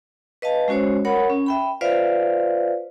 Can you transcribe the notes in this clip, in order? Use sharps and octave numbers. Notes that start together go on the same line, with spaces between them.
B4 D#5 F5 A5
G#3 C#4 F#4 C5 C#5
A#4 C#5 F#5 B5
C#4
E5 G5 B5
F4 B4 C5 D5 E5 F5